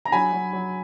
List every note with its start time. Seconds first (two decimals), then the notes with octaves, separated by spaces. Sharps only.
0.05 A#5
0.12 F#3 G#5 B5
0.33 F#3
0.53 F#3